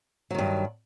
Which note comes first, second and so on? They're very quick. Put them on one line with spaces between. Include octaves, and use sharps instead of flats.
F#3 D#3 G2